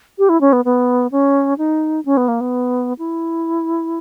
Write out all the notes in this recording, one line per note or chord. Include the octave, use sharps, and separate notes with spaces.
G4
E4
C#4
B3
B3
C#4
D#4
C#4
B3
A#3
B3
E4